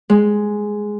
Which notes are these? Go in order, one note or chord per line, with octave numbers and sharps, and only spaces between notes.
G#3